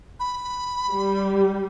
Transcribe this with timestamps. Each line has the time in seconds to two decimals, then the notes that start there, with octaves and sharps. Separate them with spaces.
0.20 B5
0.90 G3